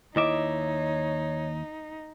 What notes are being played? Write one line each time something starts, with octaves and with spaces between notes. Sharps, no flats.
D#2 D#4 E4 C#5 D#5 E5 D6